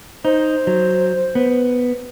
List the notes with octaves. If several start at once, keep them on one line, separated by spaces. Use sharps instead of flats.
D#4 C5
F#3
B3